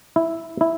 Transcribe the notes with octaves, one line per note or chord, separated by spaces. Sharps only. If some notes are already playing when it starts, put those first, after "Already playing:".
E4
E4